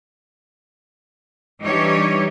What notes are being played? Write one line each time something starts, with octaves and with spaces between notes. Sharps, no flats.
E3 G3 D4 D#4 G4 C#5